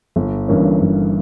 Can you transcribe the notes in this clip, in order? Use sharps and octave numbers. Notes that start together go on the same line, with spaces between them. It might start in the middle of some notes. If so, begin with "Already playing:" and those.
G1
G2 E3 A#3 C#4
G1